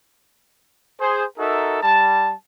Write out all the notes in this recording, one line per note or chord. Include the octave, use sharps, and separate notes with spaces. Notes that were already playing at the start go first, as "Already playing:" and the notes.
G#4 C5
D#4 F#4 A4 A#4 E5
G3 A5